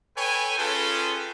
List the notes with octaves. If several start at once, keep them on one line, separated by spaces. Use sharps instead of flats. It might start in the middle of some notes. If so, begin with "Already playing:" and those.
A4 B4 C#5 G5 G#5
C#4 F4 G#4 A4 B4 G5